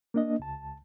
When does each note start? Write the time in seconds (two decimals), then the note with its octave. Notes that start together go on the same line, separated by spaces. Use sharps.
0.14 A#3 D4 D#5
0.39 C#2 A5